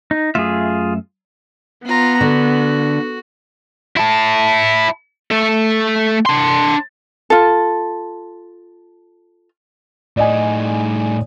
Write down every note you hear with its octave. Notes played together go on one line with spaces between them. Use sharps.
D#4
F#2 A3 F4 G#4 E5
B3 F4 A#5
D3 F#4
E4 A5
A3 A4
D4 C6
F4 A4
A2 D#4 D5 D#5 G#5